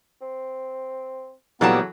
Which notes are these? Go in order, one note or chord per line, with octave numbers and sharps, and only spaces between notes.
C4
A#2 C#3 E3 F#3 G3 B3 A4 A5